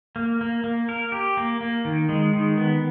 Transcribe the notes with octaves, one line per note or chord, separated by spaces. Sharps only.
A#3
A#3
A#3
A#4
G4
A#3
A#3
D#3
G#3
D#3
B3